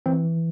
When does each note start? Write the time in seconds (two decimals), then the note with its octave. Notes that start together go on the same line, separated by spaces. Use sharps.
0.06 E3 C4